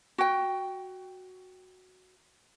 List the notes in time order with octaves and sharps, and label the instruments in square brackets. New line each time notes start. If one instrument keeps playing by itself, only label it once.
[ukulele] F#4 G5